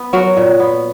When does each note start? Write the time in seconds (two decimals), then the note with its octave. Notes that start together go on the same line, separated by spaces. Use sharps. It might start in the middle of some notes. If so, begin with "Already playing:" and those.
Already playing: B3
0.13 F#3 F#4 A#4
0.37 A#2
0.60 B3